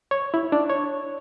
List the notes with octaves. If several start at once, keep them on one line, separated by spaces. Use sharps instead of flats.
C#5
E4
D4
C#5